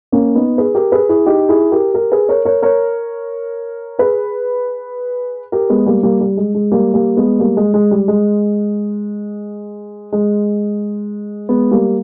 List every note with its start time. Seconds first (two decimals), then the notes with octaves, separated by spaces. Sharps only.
0.12 A#3 C#4
0.35 B3 D#4
0.58 G#4 B4
0.75 G4 A#4
0.92 G#4 B4
1.09 E4 G#4
1.26 D#4 G4
1.49 E4 G#4
1.72 G4 A#4
1.94 G4 A#4
2.12 G#4 B4
2.29 A#4 C#5
2.45 A#4 C#5
2.62 A#4 C#5
3.99 G#4 B4
5.52 G4 A#4
5.70 G#3 B3
5.86 G3 A#3
6.03 G3 A#3
6.21 G3
6.37 G#3
6.55 G#3
6.72 G3 A#3
6.94 G3 A#3
7.17 G#3 B3
7.40 G3 A#3
7.57 G#3
7.74 G#3
7.91 G3
8.08 G#3
10.12 G#3
11.49 G#3 B3
11.71 G3 A#3